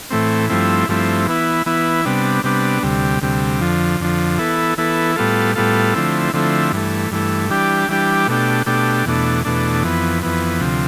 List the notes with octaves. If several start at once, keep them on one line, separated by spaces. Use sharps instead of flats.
A2 E3 A3 C4
G2 F3 A3 C4 E4
G2 F3 A3 C4 E4
E3 B3 E4
E3 B3 E4
C3 G3 B3 D4
C3 G3 B3 D4
D2 C3 G3
D2 C3 G3
F2 D3 F3
F2 D3 F3
E3 B3 E4 A4
E3 B3 E4 A4
A2 G3 B3 F4 A4
A2 G3 B3 F4 A4
D3 F3 A3 C4 E4
D3 F3 A3 C4 E4
G2 E3 A3
G2 E3 A3
E3 G3 D4 G4
E3 G3 D4 G4
B2 A3 D4 G4
B2 A3 D4 G4
E2 B2 A3 D4
E2 B2 A3 D4
F2 E3 B3
F2 E3 B3
D2 C3 F3